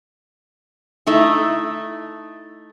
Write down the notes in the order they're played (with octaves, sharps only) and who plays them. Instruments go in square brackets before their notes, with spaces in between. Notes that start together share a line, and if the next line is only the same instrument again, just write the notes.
[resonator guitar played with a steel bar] A3 D#4 E4